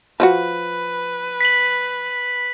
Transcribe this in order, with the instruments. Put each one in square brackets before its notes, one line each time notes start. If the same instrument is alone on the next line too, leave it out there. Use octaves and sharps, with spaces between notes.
[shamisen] F3 F4 F#4 [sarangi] B4
[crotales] B6 F#7